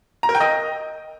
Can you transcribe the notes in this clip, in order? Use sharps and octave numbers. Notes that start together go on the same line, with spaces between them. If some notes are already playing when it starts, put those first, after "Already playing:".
A#5
A#4
G5
D#5